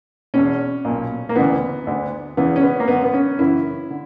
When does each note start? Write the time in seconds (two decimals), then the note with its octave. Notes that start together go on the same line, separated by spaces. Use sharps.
0.34 E2 B2 C#4
0.85 B1 A#2
1.29 A#3
1.36 D2 C#3 E3 B3
1.87 D2 D3
2.37 E2 C#3 E3 B3
2.56 C#4
2.63 B3
2.80 A#3
2.88 F#2 D3 B3
3.04 B3
3.14 C#4
3.39 F#2 C#3 E3 E4
3.90 D3